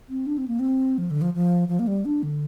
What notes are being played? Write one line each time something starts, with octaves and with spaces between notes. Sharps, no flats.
C4
D4
C4
A#3
C4
F3
D3
F3
F3
F3
A#3
G3
D4
D3